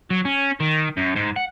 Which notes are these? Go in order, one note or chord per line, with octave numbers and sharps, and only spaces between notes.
F#3
C#4
D#3
F#2
G#2
F#5